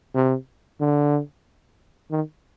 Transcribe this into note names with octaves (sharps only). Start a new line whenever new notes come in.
C3
D3
D#3